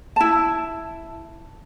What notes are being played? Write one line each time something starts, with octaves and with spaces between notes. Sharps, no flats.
E4 A5